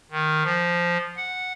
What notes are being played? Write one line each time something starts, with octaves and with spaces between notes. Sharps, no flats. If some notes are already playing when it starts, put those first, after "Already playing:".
D#3
F3
F#5